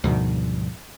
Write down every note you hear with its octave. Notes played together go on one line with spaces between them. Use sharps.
D2 G#2 B2 D#3 F3 G3